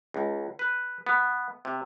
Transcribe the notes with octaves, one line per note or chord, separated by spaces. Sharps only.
C#2
B4
B3
C3